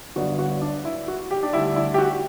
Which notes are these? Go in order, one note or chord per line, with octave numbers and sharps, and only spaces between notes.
G1 G2 D3 F#3 B3 F#4
F#4
D4
E4
F#4
G4
D4
D2 D3 G3 D4 E4
E4
G4
F#4